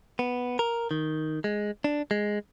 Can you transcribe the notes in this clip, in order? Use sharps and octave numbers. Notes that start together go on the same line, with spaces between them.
B3
A#4
D#3
G#3
D4
G#3